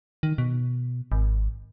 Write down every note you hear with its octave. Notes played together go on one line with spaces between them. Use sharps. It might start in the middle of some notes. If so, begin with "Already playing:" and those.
D#3
B2
G#1